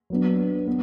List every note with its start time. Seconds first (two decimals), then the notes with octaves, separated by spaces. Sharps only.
0.10 F#3 B3 D4
0.67 B3